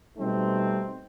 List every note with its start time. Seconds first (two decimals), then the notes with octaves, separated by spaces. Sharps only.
0.17 B2 G3 A3 C4 D#4